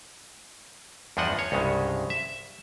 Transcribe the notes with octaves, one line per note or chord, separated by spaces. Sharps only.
E2 G2 F3 D4 D#5 F#5
C#5
C2 G2 C#3 G#3
E5